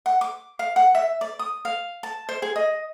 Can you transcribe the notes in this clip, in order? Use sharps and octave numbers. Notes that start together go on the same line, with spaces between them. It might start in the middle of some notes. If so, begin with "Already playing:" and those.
F#5
D6
F5
F#5
E5
D5
D#6
F5
A5
C5
G#4
D#5